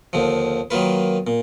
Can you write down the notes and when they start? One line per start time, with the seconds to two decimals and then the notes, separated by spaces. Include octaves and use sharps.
0.13 D#2 D3 F3
0.71 D#3 F#3 A#3 F4 B4
1.27 A#2